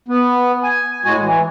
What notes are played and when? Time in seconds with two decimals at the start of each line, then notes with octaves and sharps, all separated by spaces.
0.08 B3
0.63 G#5
1.05 A2 G#3 F#4 G#5
1.22 E3